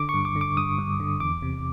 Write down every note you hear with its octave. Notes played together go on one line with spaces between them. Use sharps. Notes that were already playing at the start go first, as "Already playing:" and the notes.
Already playing: D3 D6
G2 C#6
D6
D3
D6
G2 D#6
G2
D3
E2 D6
C3